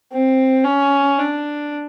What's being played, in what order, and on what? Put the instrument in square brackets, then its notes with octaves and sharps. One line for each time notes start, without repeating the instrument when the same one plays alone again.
[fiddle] C4
C#4
D4